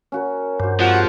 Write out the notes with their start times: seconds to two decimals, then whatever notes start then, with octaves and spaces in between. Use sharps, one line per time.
0.12 C#4 F#4 A#4
0.60 G2 F#4 C5
0.80 G#2 C3 F3 F#4 F#5